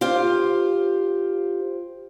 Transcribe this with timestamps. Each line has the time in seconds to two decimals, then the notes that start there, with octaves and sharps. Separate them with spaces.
0.01 F4 G4 C5